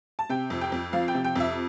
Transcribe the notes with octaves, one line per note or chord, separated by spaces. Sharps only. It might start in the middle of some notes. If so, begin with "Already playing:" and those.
A5
C3 G5
F2
G5
F2
F3 F5
G5
C3
G5
F2 E5